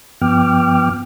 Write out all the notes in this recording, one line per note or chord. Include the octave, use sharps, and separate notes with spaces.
G2 F3 B3 G5 D6 F6